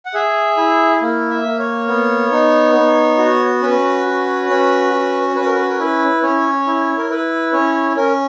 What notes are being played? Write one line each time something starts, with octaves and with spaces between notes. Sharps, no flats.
F#5
G#4 E5
E4
A#3
E5
A#3
C#5
B3
D#4
B3
F#4
C#4 B4
F#4
C#4
F#4
C#4 B4
A#4
B4
A#4
E4 B4
C#4 C#5
E4
A#4
E4 B4
C#4 C#5
C#4 A#4